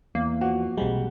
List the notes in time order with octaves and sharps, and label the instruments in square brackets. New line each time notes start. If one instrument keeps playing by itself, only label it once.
[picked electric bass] E2 [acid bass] A#3
[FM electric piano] F3 [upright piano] F#4
[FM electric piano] B1 C3 G#3 [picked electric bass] G3